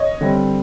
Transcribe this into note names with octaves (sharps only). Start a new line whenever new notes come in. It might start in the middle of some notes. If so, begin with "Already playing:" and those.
Already playing: C#5 D#5
D3 G3 C4